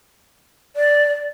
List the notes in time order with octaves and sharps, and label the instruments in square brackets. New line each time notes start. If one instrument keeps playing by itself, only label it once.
[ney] D5